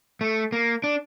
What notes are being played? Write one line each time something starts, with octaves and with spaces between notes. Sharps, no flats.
A3
A#3
D4